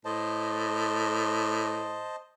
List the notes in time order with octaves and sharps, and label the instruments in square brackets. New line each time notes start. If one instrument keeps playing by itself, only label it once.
[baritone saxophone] A2 [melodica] C5 D#5 A5